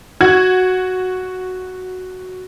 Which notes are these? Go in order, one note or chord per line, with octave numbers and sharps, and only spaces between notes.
F#4 G#6